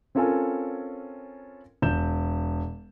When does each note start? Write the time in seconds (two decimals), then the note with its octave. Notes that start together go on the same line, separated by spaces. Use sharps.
0.15 C4 C#4 F4 A4 A#4 G#5
1.82 E1 G6 E7